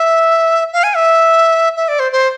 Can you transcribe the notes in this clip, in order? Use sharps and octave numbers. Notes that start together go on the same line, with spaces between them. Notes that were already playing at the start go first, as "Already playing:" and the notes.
Already playing: E5
F5
G#5
E5
E5
D5
C5
C5